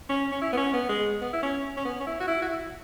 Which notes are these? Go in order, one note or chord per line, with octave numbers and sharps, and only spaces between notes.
C#4
C#4
E4
B3
C#4
B3
G#3
B3
E4
C#4
C#4
B3
C#4
E4
F#4
E4
F#4
E4